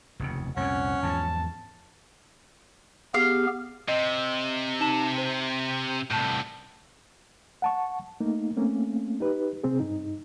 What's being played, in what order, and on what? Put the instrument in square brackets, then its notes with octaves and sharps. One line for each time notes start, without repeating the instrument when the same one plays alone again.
[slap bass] F1 D#2 C#3
[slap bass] C2 F2 A#2 [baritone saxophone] C#4 [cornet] F#5
[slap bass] E2 G#2 F3 [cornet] A5
[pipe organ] B3 G4 G#4 [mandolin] F5
[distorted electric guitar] C3 [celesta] D#5
[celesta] D#4 A5 E7
C5
[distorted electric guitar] C2 A2 [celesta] A5 G6
[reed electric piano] F#5 A5 C#6
A3 A#3 D#4
A3 A#3 C4 C#4
D#4 G4 B4
C3 C4 G#4
G2 D#4